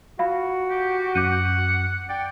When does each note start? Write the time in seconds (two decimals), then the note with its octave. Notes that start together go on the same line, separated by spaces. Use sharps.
0.19 F4 F#4 F5 B5
0.70 G4
1.15 F#2 F#5 D6 G6 D#7
2.09 D5 G5